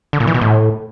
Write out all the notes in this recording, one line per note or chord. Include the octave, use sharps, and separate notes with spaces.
D3
A#2
E3
B2
A2